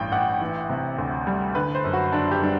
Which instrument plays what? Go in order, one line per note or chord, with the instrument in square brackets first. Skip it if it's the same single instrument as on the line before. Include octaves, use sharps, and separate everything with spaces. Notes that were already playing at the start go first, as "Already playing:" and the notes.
Already playing: [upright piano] A1 G2 G5
A1 F#5
E3
C3
D2
G3
D3 B4
C5
F#2
F#4
F#1 D4
G4
G3 D4